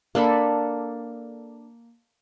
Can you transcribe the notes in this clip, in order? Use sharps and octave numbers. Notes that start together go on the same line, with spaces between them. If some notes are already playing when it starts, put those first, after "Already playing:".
A#3 D4 A4 B5